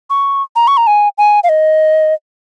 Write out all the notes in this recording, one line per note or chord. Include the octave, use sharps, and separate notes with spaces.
C#6
A#5
C#6
A#5
G#5
G#5
F5
D#5